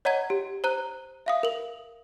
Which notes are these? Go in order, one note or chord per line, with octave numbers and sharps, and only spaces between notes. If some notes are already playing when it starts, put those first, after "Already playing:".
C#5 D#5 F#5 A#5 G#6
G4
C5 A#5 F#6
E5 F5 D#6
A#4 F#7